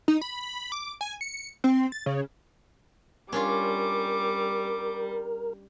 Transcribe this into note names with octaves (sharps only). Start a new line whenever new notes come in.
D#4
B5
D6
G#5
C#7
C4
A6
C#3
G3 C#4 D4 F4 A#4 D6